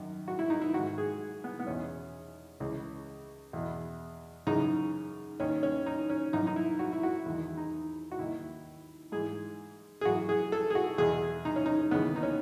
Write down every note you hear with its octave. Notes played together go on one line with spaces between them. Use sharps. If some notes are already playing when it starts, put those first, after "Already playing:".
Already playing: F#2 D#3
F#4
E4
D#4
E4
G#2 D#3 F#4
G#4
B3
B3
E2 B2 C#4
C#2 C#3 E3
E2 B2
F#2 C#3 E3 D#4
D#2 D#3 C#4
C#4
D#4
C#4
F#2 E3 D#4
D#4
E4
F#4
E4
F#4
E2 D#3 E4
D#4
F#4
D#2 D#3 E4
G#2 E3 G#4
G#4
F#2 E3 F#4
G#4
A4
G#4
F#4
E2 B2 G#4
D#4
C#4
D#4
D#2 C#3 E3 B3
D#4
C#4